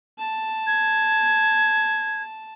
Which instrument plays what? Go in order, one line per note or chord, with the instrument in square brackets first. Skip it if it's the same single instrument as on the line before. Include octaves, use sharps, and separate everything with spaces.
[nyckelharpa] A5
[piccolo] G#6